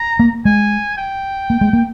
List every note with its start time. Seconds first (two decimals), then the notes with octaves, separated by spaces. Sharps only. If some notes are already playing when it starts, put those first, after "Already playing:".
Already playing: A#5
0.19 A#3
0.45 G#3 G#5
0.98 G5
1.50 A#3
1.61 G#3
1.73 A#3